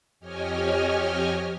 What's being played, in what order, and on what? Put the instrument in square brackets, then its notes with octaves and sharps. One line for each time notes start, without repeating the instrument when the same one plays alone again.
[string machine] F2 G4 C#5 D#5 G#5 F6